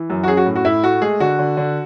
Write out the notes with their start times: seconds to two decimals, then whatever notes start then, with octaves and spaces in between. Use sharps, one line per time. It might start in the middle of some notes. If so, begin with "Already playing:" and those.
Already playing: E3
0.10 F#2
0.23 F#4
0.28 C#4 G#4
0.37 F#4
0.46 A2
0.56 F#4
0.65 A2 E4
0.83 A3 F#4
1.02 G#3 G#4
1.20 D3 F#4
1.39 D3
1.57 D3